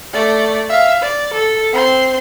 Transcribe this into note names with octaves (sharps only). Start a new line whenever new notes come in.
A3 D5
E5 F5
D5
A4
C4 C6